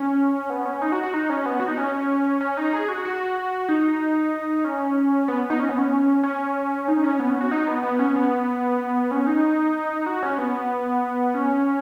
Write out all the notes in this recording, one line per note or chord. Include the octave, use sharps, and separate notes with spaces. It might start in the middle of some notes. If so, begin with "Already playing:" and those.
Already playing: C#4
B3
C#4
D#4
F#4
F#4
D#4
C#4
B3
F#4
D#4
C#4
C#4
D#4
G#4
F#4
F#4
D#4
C#4
B3
D#4
C#4
B3
C#4
C#4
D#4
C#4
B3
C#4
F#4
D#4
B3
B3
C#4
B3
C#4
D#4
F#4
C#4
B3
C#4